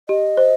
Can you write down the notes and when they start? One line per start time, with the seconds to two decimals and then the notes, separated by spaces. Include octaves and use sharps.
0.09 G4 D#5
0.37 C5